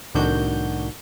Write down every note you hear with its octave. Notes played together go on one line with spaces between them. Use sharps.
C2 A2 D#3 D4 F#4 G6